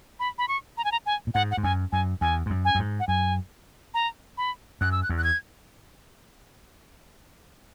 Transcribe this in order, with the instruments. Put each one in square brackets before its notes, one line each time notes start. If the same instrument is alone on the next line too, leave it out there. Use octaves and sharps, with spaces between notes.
[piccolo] B5
B5
C#6
A#5
G#5
A#5
G#5
[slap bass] A#2
[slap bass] G#2 [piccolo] F#5
[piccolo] F#5
[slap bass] G#2
[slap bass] F#2 [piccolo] G#5
[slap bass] F#2 [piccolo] G#5
[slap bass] E2 [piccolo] G#5
[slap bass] G#2
F#2
[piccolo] G#5
[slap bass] F#2
G#2
[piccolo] F#5
[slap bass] F#2 [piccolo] G#5
[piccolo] A#5
B5
[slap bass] F#2 [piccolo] F#6
[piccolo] E6
F#6
[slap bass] E2
[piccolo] F#6
G#6